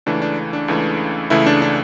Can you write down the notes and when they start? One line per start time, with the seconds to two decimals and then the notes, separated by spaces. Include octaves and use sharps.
0.06 C#2 C#3 E3 A3 D4
0.22 D4
0.53 D4
0.68 C#2 C#3 E3 A3
1.30 C#2 C#3 E3 A3 E4
1.46 D4
1.62 D4